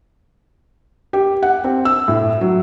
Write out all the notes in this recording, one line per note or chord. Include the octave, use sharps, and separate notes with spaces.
G4
F#5
C4
E6
A2
F#3